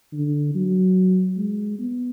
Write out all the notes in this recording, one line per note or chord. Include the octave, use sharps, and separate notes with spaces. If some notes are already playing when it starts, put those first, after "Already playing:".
D3
F#3
G#3
B3